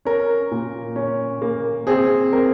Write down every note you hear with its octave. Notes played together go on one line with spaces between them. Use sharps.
C#4 A#4
A#2
C#4
A#3
C4 G#4
C4 A#4